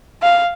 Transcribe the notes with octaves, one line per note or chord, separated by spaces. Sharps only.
F5